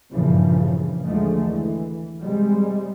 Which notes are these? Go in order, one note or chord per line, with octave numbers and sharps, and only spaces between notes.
G2 A#2 C#3 E3 F3
D#2 D3 F3 G#3 A3
E3
C3 G3 G#3